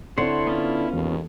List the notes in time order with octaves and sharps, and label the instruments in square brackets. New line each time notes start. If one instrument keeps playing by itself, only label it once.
[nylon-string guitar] D3 [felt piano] C4 C6 [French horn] E4 [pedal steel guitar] C5 C#5 F#5
[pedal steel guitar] B3 C#4 F4
[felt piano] E1 [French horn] D#2